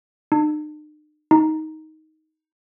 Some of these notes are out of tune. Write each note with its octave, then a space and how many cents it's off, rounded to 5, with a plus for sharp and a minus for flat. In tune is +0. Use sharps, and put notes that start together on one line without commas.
D#4 -45
D#4 +15